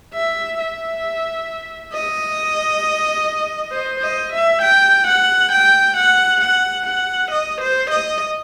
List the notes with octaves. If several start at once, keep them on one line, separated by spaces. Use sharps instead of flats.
E5
E5
D#5
C5
D#5
E5
G5
F#5
G5
F#5
F#5
F#5
D#5
C5
D#5